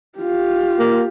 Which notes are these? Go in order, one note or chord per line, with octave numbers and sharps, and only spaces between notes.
F4 G4
A#3